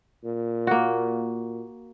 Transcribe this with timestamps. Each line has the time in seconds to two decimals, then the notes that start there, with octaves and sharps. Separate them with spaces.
0.25 A#2
0.67 A#3 F#4